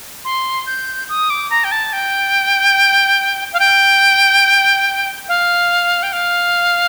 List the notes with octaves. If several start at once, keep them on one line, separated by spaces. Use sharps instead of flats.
C6
G6
D#6
D6
A#5
G5
A5
G5
F5
G5
F5
G5
F5